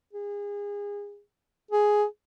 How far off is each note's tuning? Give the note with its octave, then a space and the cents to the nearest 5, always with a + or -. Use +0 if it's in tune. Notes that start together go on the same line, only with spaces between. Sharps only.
G#4 -30
G#4 +5